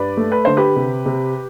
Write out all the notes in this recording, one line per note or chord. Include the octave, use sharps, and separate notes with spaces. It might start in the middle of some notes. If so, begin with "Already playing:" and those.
Already playing: G2 B4 D5
A3
B4
D3 C5
G4 B4
C3
C3